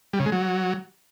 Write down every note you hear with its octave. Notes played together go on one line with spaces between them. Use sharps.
G3
C#3
G#3
F#3